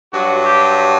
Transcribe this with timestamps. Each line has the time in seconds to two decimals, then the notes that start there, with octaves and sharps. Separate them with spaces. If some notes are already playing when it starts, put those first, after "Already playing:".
0.12 G2 F#3 F#4
0.45 G4